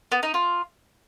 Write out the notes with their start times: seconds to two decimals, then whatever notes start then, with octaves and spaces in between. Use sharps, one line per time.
0.12 B3
0.23 D#4
0.34 F4